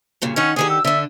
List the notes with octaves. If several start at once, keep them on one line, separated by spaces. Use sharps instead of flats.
G2 A#2 C#3
D#3 C#4 D#4 F#5
D3 D#3 G4 G#4
E6
D3 D4 E5